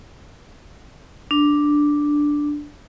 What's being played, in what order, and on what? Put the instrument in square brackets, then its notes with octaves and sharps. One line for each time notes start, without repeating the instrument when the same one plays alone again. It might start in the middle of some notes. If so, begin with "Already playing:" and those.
[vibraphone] D4